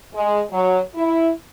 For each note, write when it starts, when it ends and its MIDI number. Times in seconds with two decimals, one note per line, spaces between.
0.15 0.40 56
0.51 0.79 54
0.95 1.30 64